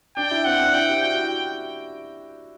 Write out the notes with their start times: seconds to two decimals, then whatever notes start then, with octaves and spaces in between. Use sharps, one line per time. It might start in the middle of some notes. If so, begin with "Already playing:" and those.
0.16 D4 G5
0.31 E4
0.46 C4 F#5
0.59 D4
0.74 E4 G5
0.89 G4
1.03 F#4 G5
1.17 E4